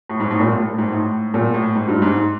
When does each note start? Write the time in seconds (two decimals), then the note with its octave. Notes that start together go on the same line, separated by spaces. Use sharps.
0.10 A2
0.20 G#2
0.31 A2
0.40 A#2
0.51 A2
0.65 A2
0.78 G#2
0.92 A2
1.34 A#2
1.54 A2
1.75 G#2
1.88 G2
2.02 G#2